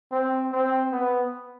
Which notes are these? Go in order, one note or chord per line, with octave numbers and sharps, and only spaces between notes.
C4
C4
B3